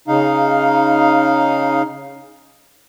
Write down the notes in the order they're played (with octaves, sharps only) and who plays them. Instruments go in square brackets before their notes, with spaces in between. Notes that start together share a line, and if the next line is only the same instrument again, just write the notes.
[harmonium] C#3 D#4 F5